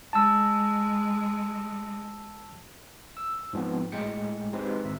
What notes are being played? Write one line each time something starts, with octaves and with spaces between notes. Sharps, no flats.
G#3 A5 E6
E6
G#2 F3 B3 C4
A2 G#3 G5 C#7
G#3 C4 D#4 G4 B4 C5
G#1 E5